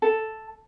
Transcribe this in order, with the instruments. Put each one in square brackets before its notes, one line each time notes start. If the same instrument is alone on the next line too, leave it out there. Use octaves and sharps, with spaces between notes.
[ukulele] A4